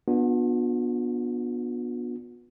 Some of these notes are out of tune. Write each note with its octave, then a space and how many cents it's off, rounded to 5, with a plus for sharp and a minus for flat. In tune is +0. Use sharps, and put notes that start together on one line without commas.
B3 -20 D4 +0 F4 +45